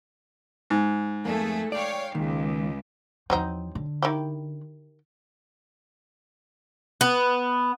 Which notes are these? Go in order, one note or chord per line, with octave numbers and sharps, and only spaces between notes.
G#2
F2 A3 A#3 G#4 A4
C#5 D5 F5 G5
C#2 D#3 A#3
E2 F3 F#3 C4 D#4
D3
D#3 E4 G4
B3